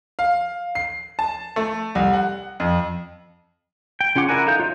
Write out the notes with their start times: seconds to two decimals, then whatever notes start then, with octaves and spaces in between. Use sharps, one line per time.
0.19 F5
0.75 C7
1.19 A5
1.56 A3
1.95 C2
2.13 F#5
2.60 F2
4.01 G5
4.16 C#3 C#4 F4 F#5 D6
4.29 E4 A#4 D5 F#5 G#5
4.47 D#4 A4 F5 G6
4.60 F4 C#5 E5